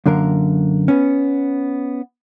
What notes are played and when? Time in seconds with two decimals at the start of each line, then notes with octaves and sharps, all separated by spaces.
0.06 F#2 D3 A#3 A#4
0.88 B3 C#4